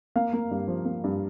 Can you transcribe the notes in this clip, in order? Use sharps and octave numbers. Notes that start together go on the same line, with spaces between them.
A#3 F5
A#3
G2
F3
A#3
G2